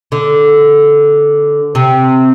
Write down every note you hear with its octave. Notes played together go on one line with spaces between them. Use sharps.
D3
C3